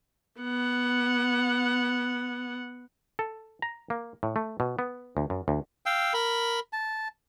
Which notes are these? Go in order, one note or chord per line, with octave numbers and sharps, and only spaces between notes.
B3 F#5
A4
A#5
A#3
A2
A3
B2
B3
D2
F#2
D2
F5 G5 E6
A#4 B5
A5